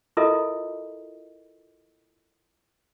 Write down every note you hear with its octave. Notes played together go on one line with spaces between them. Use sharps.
E4 F4 A4 A#4 D#5 E5